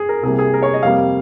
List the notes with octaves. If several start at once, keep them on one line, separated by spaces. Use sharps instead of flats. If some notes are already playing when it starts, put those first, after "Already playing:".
Already playing: G#4
A#4
C2 C3 G3 A#3 G#4
G#4
A#4
C#5
D#5
F2 C3 G3 A#3 F5